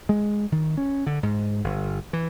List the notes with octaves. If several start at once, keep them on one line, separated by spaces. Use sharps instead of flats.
G#3
D#3
C#4
D3
G#2
G1
E3